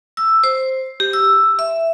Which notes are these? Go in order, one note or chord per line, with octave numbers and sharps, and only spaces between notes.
E6
C5
G4
E6
E5